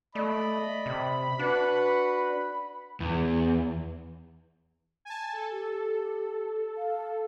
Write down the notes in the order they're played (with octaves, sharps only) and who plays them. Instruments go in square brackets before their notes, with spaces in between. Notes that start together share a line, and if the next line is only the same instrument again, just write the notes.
[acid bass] A3 [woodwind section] D5 D#5 [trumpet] B5
[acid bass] C3
[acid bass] D4 [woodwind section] F#4 B4 F#5
[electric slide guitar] E2
[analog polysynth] G#5 A5
A4
[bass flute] G4
F5